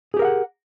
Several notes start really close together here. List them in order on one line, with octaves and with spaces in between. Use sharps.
G#4 G4 A#4 F5 F#5